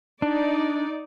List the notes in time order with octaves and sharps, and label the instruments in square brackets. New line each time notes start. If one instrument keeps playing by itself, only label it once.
[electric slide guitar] D4 [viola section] D#4 D5